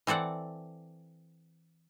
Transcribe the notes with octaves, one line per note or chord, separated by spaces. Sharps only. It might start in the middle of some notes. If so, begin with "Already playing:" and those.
E3 C4 A4 D5 F#5